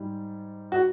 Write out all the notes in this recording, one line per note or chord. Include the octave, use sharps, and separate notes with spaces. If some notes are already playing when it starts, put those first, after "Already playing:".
Already playing: G#2 G3
F#4